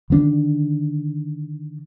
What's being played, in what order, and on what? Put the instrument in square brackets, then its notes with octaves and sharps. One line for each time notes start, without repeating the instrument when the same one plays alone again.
[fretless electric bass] D3 D#3 B3 D4